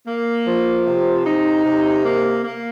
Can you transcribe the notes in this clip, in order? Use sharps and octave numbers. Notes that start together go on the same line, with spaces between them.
A#3
F3
C3
D#4
C3
A#3
A#3